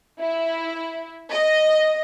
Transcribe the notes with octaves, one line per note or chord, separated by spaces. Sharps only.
E4
D#5